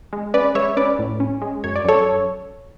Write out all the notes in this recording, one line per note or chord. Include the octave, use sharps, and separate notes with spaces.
G#3
C#4 B4 D5
G#3 C#5 E5
C#4 B4 D5
A2
C#4
G#3
F#2 C#5
D5
F#2 A4 C#5